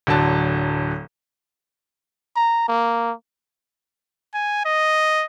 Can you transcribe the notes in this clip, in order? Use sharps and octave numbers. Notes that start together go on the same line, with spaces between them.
D1 D3 F#3 A5
A#5
A#3
G#5
D#5